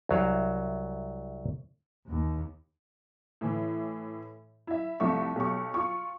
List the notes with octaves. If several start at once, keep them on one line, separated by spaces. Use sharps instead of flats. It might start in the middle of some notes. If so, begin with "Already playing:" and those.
C2 F#3 F5
D#2
A2 E3
E4 E5
C2 F3 A3 E5 C#6
B1 G4 C#6
F4 C#6